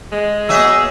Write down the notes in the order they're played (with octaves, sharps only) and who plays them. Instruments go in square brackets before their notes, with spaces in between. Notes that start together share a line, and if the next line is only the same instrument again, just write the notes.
[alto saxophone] G#3
[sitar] F#3 D#5 E5 [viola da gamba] B3 G#4 [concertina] E6